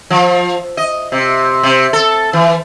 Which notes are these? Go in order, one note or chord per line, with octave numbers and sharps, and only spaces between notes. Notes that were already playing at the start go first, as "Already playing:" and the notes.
F3
D#5
C3
C3
A4
E3